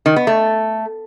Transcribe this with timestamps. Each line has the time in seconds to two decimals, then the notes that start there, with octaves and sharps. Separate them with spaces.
0.06 D#3
0.16 B3
0.27 A3